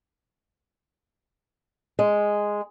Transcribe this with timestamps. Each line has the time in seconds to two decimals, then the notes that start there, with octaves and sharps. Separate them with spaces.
1.99 G#3